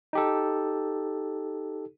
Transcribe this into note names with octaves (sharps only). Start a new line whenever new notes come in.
D#4 G4 A4